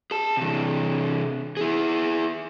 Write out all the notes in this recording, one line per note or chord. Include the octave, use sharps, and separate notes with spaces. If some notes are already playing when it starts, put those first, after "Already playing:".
G#4 A5
C3 E3
E4 G#4